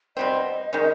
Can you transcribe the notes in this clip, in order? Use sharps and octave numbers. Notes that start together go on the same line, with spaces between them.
B2 G3 C4 D#5
D#3 G#3 C#4